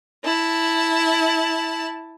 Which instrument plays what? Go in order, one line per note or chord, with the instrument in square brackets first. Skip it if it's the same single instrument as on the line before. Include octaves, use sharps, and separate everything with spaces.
[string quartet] E4 A5